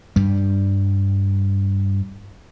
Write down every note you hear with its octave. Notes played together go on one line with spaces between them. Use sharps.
G2 G3